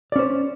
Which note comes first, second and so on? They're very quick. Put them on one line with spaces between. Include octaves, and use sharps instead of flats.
D5 C#4 C5